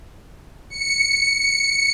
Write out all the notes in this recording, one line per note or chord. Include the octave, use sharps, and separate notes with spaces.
C#7